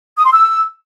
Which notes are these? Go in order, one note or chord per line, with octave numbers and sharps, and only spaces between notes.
D#6
C6
E6